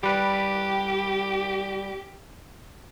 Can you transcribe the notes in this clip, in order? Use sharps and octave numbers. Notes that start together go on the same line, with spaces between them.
G3 G4 B4